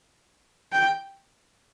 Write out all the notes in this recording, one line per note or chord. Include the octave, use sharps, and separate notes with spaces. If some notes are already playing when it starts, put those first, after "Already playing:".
G5